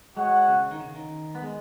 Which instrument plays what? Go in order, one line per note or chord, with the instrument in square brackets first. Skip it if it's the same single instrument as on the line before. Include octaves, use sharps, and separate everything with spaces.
[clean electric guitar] G#3 [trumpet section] F#4 C#5 F#5
[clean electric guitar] C#3
D#3
C#3
D#3
B3
G#3